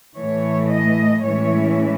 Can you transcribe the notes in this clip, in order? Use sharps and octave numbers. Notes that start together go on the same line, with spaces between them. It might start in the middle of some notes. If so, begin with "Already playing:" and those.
A2 E3 A3 C#5
D#5
A2 E3 G#3 C#4 E4 C#5